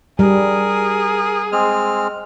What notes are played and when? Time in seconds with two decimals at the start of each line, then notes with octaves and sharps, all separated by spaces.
0.19 G3 G#4 A#4
1.52 G#3 C4 F6